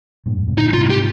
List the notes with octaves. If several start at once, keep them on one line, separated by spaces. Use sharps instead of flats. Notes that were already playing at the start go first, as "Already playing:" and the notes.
G2 A#2
F2 G#2
G#2 C3
A#2 D3 D#4
G#2 C3 F4
G4